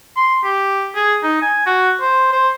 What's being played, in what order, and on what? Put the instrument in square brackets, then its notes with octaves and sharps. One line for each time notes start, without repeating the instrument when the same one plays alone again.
[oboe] C6
G4
G#4
D#4
G#5
F#4
C5
C5